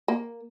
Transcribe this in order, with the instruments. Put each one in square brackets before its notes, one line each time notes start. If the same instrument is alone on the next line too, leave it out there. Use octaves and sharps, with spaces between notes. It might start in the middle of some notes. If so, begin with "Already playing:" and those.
[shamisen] A#3